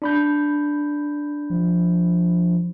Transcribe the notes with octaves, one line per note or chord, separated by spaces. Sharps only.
D4 B5 G6
F3